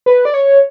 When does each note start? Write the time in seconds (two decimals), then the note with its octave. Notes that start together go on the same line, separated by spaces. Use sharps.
0.06 B4
0.25 D5
0.34 C#5